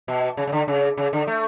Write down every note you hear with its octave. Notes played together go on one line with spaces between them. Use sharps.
B2
C#3
C#3
D3
C#3
C#3
D3
A3